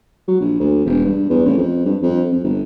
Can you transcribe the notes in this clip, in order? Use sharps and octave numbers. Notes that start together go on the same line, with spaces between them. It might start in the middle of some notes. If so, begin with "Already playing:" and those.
F#3
A#1
D2
E1
G2
E2
A1
F2
G2
F2
F2
G1